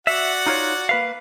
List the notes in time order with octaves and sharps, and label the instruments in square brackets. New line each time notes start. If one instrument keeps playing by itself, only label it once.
[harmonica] F#4 D5 F#5 [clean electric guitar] E5
[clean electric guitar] D#4 F4 C#5
A#3 B4 F5